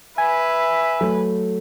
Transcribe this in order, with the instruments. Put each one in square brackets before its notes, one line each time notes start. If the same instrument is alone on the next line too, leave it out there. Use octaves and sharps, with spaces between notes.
[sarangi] B4 [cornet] E5 [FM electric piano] G#5
[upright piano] F#3 A3